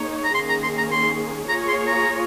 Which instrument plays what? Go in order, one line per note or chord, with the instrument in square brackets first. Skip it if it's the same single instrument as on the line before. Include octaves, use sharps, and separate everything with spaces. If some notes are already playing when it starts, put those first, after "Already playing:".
Already playing: [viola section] A#3 D#4 G#4 C#5
[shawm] A#5
[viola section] D#3 A#3 C#4 G#4 [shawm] C6
[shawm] A#5
C6
A#5
C6
[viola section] A#3 F4 G#4 C#5 [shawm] A#5
[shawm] C6
A#5